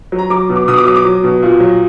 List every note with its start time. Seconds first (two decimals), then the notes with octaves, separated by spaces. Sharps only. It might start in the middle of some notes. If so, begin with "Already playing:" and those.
0.12 F#3
0.19 A#5
0.30 F#3 D6
0.49 B2
0.56 D6
0.68 B2 D#6
0.77 D6
0.86 F#3 D#6
0.96 D6
1.05 F#3
1.24 B2
1.43 A#2
1.60 F#3